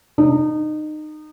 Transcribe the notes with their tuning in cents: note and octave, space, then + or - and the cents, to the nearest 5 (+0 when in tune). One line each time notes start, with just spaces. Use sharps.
D#4 -25